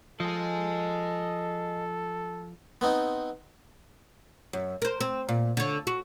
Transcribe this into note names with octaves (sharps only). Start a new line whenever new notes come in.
F3 A4 D#5 G#5
B3 C4 D#4
F#2
A#4 C5
C4
A#2
D3 C#5
F#4